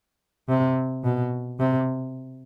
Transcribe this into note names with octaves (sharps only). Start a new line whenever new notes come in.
C3
B2
C3